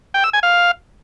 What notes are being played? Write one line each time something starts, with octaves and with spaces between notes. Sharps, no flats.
G5
E6
G#5
F5